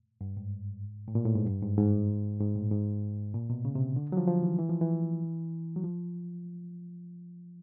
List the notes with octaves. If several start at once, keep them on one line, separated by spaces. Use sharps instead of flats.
G2
G#2
A2
A#2
A2
G#2
G2
G#2
G#2
G#2
A2
A#2
G#2
A#2
B2
C#3
C3
D3
F#3
F3
F3
E3
E3
F3
E3
F#3
F3